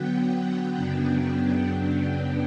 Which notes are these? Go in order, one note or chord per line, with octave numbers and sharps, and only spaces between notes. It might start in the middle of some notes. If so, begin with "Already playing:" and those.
Already playing: D3 F#3 B3 F#5 G5
F#2 C#3 F#3 B3 D4
G5